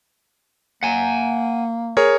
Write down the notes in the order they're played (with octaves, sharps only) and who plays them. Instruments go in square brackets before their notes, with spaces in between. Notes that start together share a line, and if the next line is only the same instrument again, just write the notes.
[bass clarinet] A#3 [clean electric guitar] F#5 G#5
[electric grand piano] G#4 A#4 C#5